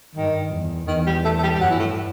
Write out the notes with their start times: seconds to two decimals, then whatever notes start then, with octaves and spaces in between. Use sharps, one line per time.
0.15 G2 D#3
0.52 E2
0.88 E2 D#3
1.06 G3
1.25 A3
1.38 A3
1.43 G3
1.54 G3
1.61 G2 F#3
1.70 E3
1.79 A2